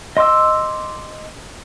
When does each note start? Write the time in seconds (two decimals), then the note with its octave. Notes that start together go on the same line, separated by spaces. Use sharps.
0.17 D#5 C6 D6 E6